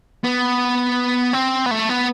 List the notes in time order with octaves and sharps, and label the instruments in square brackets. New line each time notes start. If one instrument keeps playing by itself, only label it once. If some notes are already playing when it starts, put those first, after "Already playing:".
[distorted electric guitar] B3
C4
B3
A3
B3